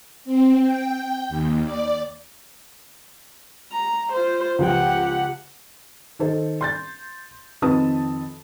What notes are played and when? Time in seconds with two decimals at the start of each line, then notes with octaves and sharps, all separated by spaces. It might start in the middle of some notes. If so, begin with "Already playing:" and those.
0.25 C4
0.62 G5
1.29 D#2
1.65 D5
3.72 A#5
4.12 F4 C5
4.59 C#2 F3 G4 F#5 G5
6.19 D#3 A4 C5
6.61 C6 G6 A6
7.62 F2 D#3 C4 B4 A5 D#6